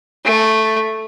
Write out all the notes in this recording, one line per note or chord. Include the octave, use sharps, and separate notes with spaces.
A3